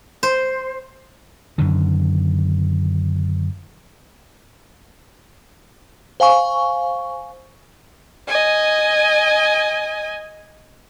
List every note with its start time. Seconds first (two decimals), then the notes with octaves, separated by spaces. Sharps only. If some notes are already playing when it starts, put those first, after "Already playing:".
0.23 C5
1.58 F#2 D3 D#3
6.20 C5 F5 G#5 C#6
8.28 D#5 G#5